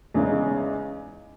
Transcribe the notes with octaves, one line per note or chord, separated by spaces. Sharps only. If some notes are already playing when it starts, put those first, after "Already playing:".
E2 C#3 G#3 D#4